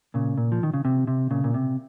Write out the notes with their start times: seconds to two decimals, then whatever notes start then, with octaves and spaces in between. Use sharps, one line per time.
0.14 A#2 C#3
0.38 A#2
0.52 F3
0.63 D#3
0.74 C#3
0.85 C3
1.07 C3
1.31 A#2 C#3
1.44 A#2
1.54 C3